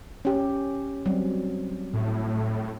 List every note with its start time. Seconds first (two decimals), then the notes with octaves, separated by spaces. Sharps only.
0.25 C#4 G4
1.06 F#3 G3 C4
1.93 A2